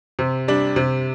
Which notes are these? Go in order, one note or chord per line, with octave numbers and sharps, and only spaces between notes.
C3
G3 D4
C3